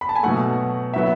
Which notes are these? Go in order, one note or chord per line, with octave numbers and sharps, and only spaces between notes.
B5
A5
G#5
B2 F#3 A3 F#5
F#3 B3 E5